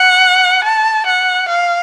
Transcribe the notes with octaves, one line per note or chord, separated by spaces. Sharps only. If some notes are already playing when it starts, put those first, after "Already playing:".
Already playing: F#5
A5
F#5
F5